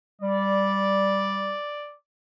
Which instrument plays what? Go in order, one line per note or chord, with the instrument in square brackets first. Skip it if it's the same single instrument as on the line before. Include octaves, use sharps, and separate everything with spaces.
[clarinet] G3 [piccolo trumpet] D5